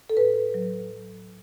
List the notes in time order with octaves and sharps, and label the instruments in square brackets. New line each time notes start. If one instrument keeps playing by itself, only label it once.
[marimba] A4
A2 B4
F#3
F#3